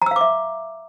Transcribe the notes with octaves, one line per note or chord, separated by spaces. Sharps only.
E5 F5 A#5 D6 E6